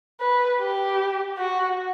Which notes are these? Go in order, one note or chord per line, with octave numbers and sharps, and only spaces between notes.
B4
G4
F#4